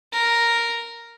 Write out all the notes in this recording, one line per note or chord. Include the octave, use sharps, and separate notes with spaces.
A#4